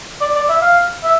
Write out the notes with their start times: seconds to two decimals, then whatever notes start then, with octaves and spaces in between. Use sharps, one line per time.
0.21 D5
0.35 D5
0.50 E5
0.62 F5
1.04 E5